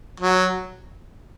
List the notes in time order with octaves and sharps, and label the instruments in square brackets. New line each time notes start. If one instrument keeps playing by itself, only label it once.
[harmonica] F#3